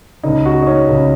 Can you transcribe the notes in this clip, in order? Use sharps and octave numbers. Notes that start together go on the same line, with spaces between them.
C#2 C#3 D#4
F#4
D#4
C#4
C#2 C#3